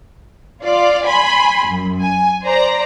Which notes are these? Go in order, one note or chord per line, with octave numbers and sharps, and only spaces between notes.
F4 D5 F5
G#5 B5 C6
F#2
G#5
C5 D5 A#5